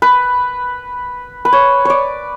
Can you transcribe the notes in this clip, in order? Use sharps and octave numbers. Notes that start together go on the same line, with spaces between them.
B4
B4
C#5
C#5 D5